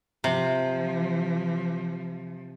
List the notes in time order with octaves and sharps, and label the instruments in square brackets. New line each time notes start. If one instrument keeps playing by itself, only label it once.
[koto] C3 [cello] F3